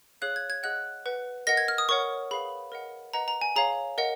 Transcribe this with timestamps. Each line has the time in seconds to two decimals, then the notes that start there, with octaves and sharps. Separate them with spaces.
0.22 G#4 C#5 F5 F#6
0.36 G#6
0.50 G#6
0.63 G#4 D#5 F#5 F#6
1.06 B4 F#5
1.47 A#4 D#5 F#5 A#6
1.57 G#6
1.68 F6
1.78 D#6
1.89 A#4 C#5 F#5 C#6
2.31 G#4 B4 F5 B5
2.72 A#4 D#5 F#5
3.14 B4 D#5 F#5 A#5
3.28 A#5
3.41 G#5
3.56 G#4 C#5 F5 A#5
3.98 A#4 D#5 F#5